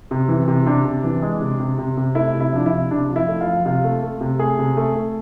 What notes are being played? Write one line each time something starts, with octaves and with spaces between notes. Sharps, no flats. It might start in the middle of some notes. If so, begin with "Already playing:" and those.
C3
E3
C3
C3 D4
C3
E3
G#3
C3
C3
C3
C3
A3 E4
C3
E4
F3 D4
E4
C3
C3 D4
F3
E4
A3
F4
F3
C3 F4
A3
A3
C3
A3 G#4
C3
A3
A3